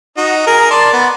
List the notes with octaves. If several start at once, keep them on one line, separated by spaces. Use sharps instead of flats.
D#4 F#4
G#4 A#4 A#5
D5 A5 C6
B3